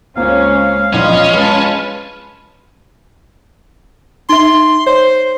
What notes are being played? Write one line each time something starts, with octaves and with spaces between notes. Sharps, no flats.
C#2 A#3 C4 C#4 F4 F5
A#1 E2 C#4 B4 D#5 C6
G#3 F4 B4 A5
D#4 E5 C6
C5 C#5